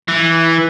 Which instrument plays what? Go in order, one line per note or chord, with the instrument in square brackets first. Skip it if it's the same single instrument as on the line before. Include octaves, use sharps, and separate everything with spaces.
[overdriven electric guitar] E3